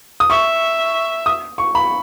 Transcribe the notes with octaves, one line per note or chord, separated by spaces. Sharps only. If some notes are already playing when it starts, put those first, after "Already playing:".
D#6
E5 C#6
D#6
C#6
B5